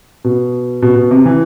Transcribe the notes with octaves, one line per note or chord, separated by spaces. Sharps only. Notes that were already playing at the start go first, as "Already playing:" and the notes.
B2
B2
B2
C3
E3